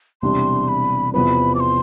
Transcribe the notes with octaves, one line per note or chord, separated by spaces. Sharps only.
E1 E2 C3 G3 D4 C6
B5
E2 C3 F3 B3 B5
D6
C6